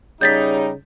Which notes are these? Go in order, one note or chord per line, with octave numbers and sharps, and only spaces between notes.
C#3 G3 D#4 G6 A6 B6